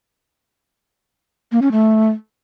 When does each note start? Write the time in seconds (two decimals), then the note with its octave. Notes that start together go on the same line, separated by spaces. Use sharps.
1.52 A#3
1.62 C#4
1.72 A3